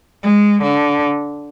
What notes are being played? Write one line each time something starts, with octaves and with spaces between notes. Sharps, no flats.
G#3
D3